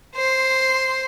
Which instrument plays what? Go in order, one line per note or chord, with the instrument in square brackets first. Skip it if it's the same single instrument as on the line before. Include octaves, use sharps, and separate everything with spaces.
[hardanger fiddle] C5 C6